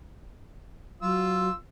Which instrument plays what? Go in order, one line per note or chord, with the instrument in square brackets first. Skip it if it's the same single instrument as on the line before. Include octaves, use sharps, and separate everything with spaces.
[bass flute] F#3 [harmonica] F4 E6